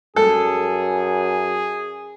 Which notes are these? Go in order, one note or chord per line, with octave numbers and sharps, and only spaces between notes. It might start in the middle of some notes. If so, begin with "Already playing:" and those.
F#2 G#4 A4